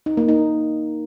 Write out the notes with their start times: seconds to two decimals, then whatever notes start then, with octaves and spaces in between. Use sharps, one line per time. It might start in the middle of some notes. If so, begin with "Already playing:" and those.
0.06 D#4
0.17 A#3
0.29 D#4